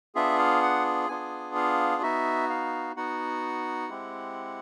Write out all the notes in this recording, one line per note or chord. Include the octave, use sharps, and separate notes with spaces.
B3 D4 F4 G#4 E5
F5
F#5
B3 D4 F4 G#4 G#5
F5
B3 D#4 F#4 E5
F5
B3 D#4 F#4 F#5
G#3 C4 E4 G4